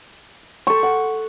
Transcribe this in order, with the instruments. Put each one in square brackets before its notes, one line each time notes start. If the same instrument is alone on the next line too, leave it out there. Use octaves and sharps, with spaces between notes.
[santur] A4 G5 [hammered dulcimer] C#6
[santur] F#5